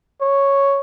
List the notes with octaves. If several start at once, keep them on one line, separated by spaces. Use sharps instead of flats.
C#5